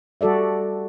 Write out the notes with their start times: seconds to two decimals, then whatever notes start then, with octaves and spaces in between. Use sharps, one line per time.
0.21 G3 F#4 A4 D5 E5